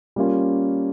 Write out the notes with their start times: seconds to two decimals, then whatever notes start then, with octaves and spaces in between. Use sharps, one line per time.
0.16 G3 A#3 C#4 F4